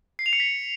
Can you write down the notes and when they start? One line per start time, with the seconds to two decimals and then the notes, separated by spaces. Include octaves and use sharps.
0.19 C7
0.26 F7
0.33 C#7
0.40 B6